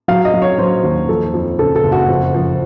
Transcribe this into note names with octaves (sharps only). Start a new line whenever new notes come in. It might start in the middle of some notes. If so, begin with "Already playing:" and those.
F#3 F5
D#5
F#3
C#5
F#3 C5
D#2
F3 A4
F2
C#3 A4
A4
F#1
F#4
F2
F3